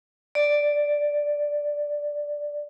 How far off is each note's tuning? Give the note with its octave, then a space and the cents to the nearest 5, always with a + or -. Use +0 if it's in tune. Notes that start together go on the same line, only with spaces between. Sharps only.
D5 +0